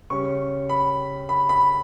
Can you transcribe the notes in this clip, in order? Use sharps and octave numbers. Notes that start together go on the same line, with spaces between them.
C#3 G3 C#4 C#6
B5
B5
B5